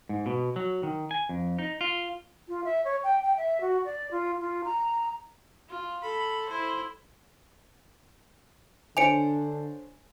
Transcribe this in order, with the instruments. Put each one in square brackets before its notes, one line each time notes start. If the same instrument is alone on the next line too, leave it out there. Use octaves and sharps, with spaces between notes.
[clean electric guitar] G#2
B2
F#3
D#3
G#5
F2
D#4
F4
[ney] F4
E5
C#5
G5
G5
E5
F#4
D5
F4
F4
A#5
[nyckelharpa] F4
A4 B5
E4 C5
[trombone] D3 [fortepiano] D4 C5 C#5 [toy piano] G#5 [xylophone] C#7 D7 F7